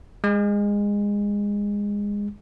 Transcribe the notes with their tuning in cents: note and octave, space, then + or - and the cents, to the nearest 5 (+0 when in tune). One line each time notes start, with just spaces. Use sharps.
G#3 -20